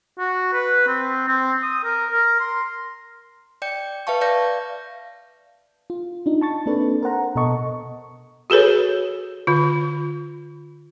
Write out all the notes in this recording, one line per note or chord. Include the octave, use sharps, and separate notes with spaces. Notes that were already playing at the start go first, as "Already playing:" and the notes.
F#4
B4
C4
C4
D#6
A#4
A#4
C6
D5 G5 G6 C#7
B4 E5 F5 A5 C#6
D5 F5 G6 A#6
F4
D4 D#4 F4
A5 C#6 A6
A#3 C4 D4 A4 B4
A#4 C5 F#5 A#5
B2 B3 A4 D#5 A5 C#6
F#4 G#4 A4 B4 C#5
D3 F4